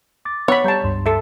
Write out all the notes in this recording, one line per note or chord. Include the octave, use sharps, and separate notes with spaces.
D6 A6
B3 C#5 F#5 B5
G3 A5 A#5 C#6 G6
C#2 G2 C6
A4 E5